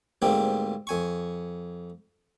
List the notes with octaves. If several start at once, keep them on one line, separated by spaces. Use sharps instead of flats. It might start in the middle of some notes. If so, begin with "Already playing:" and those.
D2 G#2 G3 A#3 C4
F2 G#5 C#6